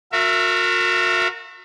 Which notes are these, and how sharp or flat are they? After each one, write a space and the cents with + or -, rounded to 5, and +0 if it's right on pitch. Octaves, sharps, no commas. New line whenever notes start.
F#4 -35 A#4 -25 E5 +20